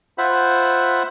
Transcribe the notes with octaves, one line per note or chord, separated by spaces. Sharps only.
F4 C5 E5 F#5 B5